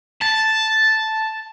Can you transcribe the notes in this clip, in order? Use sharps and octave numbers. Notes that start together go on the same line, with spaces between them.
A5